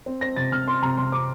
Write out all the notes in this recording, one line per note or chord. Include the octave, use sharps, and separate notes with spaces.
C4
C4 A#6
C3 A6
C3 F6
C4 C6
C3 A#5
C3 C6
C4 D6